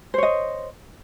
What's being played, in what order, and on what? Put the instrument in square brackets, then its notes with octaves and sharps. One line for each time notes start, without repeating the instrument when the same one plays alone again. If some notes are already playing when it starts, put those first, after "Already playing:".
[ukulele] C5
C#5
D#5